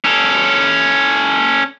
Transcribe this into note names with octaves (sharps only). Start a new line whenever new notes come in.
C#4 A4